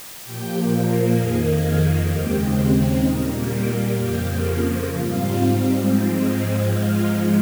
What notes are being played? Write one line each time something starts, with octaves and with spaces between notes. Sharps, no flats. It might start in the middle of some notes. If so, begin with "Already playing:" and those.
A#2 F3 A#3 G4 G5
F2 D#3 A#3 G#4 G#5
G#4 G#5
D#2 C#3 G#3 C4 G4 G5
A#2 G3 A#3 D#4 D#5
G4 G5
F2 C#3 F3 A#3 G4 G5
G#2 G3 C4 F4 F5
G#2 F3 G#3 C4
G#2 F3 G#3 F4 F5